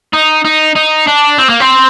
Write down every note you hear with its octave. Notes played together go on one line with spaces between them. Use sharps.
D#4
D#4
D#4
D4
C4
A#3
C4